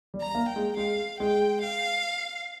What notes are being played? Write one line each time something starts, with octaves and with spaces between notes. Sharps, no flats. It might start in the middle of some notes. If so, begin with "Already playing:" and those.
G3
A#5
A#3
G5
G#3
G#3 F5
G#3 G5
F5